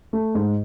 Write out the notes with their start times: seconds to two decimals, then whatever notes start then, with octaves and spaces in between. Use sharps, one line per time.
0.13 A3
0.35 G#2